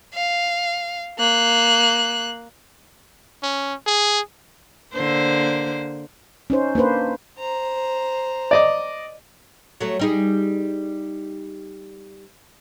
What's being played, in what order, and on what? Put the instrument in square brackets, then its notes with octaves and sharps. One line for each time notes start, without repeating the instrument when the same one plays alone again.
[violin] F5
A#3 F#6
[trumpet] C#4
G#4
[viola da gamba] D3 A#3 C5
[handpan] C#4 D#4 C5
A#3 D4 B4 C5
[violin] C5 A#5
[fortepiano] D5 D#5 D6
[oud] F#3 A3
G3 D#4 G#4